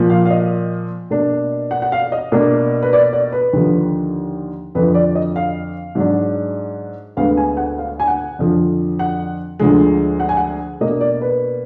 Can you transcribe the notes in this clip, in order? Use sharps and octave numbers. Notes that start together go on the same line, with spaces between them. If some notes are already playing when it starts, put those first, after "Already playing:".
Already playing: A#2 F3 A#3
F5
F5
D#5
B2 A#3 D4
F#5
F#5
F5
D#5
B2 A#3 D4
B4
D5
D5
B4
D#2 D3 F3
F2 D3 F3 B4
D5
D#5
F5
G#2 F#3 D4
D2 D3 G#3 B3 F5
G#5
F#5
F5
G#5
F#5
F2 D3 F3
F#5
D2 D3 F3 G#3
F#5
G#5
F#5
B2 A#3 D4 D#5
D5
B4